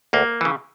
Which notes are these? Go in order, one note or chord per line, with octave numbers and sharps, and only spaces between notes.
D2 A#3
C#3 E3